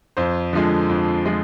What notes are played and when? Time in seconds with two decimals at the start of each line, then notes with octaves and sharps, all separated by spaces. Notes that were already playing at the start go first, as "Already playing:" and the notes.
0.17 F2 C5
0.53 D3 F3 G#3
0.89 F2
1.26 F3 G#3